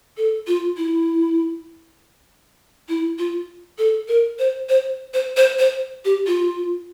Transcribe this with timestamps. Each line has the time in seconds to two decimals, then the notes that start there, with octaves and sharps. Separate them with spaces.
0.17 A4
0.47 F4
0.77 E4
2.89 E4
3.19 F4
3.78 A4
4.08 A#4
4.39 C5
4.69 C5
5.14 C5
5.37 C5
5.59 C5
6.05 G4
6.27 F4